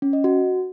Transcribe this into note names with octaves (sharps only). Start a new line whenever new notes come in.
C#4
D#5
F#4